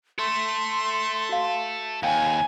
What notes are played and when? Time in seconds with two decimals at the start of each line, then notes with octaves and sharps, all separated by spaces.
0.19 A4 E5 C6
1.29 F#4 F5
2.03 D#2 F5 G5 G#5